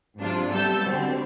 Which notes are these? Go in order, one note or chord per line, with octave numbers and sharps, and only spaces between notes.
G#2 C3 F#3 D4 F4
G3 B3 A4 E6 G6 A6
B2 D3 G3 C4